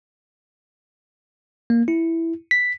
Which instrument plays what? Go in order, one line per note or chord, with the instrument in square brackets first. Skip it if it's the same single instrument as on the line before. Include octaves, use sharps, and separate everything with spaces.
[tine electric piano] A#3
E4
B6